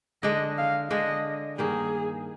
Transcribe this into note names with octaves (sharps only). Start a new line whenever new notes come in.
D3 G#3 D4 D#5
F5
D3 G#3 D4 D#5
G2 D#3 A#3 G#4